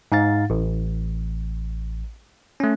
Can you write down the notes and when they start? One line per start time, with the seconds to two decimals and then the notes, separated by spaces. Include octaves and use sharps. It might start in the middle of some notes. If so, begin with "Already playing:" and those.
0.12 G#2 D#4 F5 A6
0.50 A1
2.60 A3 C#4